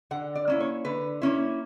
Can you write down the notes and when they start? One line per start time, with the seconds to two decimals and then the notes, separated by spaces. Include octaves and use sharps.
0.11 D3 F#5
0.35 D5
0.48 A#3 C#4 E4
0.60 C#5
0.85 D3 B4
1.22 A#3 C#4 E4